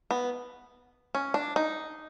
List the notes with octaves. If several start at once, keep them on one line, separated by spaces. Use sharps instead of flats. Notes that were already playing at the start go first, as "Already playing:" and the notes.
B3
C#4
D4
D#4